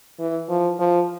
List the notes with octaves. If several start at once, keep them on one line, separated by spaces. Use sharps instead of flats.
E3
F3
F3